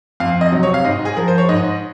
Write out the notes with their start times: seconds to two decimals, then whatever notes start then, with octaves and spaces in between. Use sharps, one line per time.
0.20 F2 F5
0.41 D#5
0.52 C3 F#3
0.63 C#5
0.74 F5
0.84 G#2 D#5
1.05 G#4
1.17 F3 A#4
1.28 C5
1.38 C#5
1.49 G#2 D#5